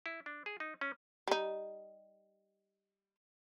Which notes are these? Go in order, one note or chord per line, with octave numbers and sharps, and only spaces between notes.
E4
D4
G#4
D#4
C#4
G3 D#4